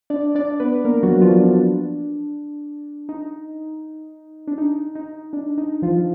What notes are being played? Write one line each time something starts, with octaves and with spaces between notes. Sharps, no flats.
D4 D5
D4 D5
B3 B4
A#3 A#4
F#3 F#4
F3 F4
D4
D#4
D4
D#4
D#4
D4
D#4
F3 F4